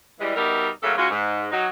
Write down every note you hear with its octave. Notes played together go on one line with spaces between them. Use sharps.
E3 G3 G#3
B2 G3 D#4 A#4 D5 E5
C#3 F#3 A3 A#3 C#4 A4
C#3 G#3 C#4 F4 F#4
G#2
F#3 D#4